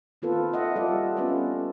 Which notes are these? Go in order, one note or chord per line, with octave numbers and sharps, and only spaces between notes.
D#3 A#3 C4 F4 A4 B4
D#5 E5 F#5
G3 F4 A4 D5
B3 C#4 D4 F4 A4 B4